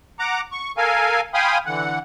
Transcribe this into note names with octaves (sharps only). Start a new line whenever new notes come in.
F#5 A#5 D6
C#6
A4 A#4 F5 G#5
F5 G5 G#5 B5 C6 D#6
D3 E3 F#5